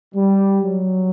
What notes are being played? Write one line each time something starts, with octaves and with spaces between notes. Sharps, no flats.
G3
F#3